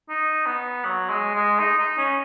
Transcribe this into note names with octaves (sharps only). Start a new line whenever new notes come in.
D#4
B3
F#3
G#3
G#3
D#4
D#4
C#4